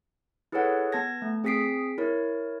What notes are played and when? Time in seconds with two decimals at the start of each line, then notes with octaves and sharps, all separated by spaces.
0.52 E4 G#4 A4 B4 C#5 F#5
0.92 B3 A5 G#6 A#6
1.22 A3
1.44 C4 G#4 D#6 B6 C7 D7
1.98 E4 A#4 C#5